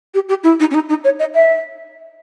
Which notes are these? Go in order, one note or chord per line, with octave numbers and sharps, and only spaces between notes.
G4
G4
E4
D#4
C#4
D#4
D#4
C#5
D#5
E5